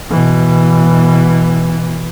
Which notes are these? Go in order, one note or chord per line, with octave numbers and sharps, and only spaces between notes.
B2 E3